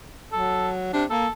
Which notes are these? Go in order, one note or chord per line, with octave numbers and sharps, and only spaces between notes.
F#3 A4
C3 D4
A#3 A4